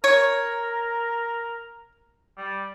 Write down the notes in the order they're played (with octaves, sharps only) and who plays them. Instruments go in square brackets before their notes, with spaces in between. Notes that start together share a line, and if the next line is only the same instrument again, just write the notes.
[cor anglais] A#4 [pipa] C#5
[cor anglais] G3